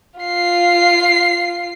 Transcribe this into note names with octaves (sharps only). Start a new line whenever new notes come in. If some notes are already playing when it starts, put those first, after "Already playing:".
F4 C7